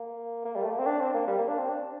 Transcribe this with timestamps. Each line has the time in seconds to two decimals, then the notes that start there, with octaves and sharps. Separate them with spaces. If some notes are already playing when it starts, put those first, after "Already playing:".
Already playing: A#3
0.45 A#3
0.56 G3
0.63 A3
0.71 A#3
0.79 C4
0.86 D4
1.00 C4
1.14 A#3
1.28 G3
1.38 A#3
1.48 D4
1.58 C4
1.69 D4